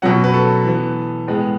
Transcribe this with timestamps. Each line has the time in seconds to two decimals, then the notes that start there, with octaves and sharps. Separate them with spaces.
0.02 B2 F#3 C#4 F#5
0.24 B4
0.34 A4
0.65 E3 B3
1.27 A2 G#3 B3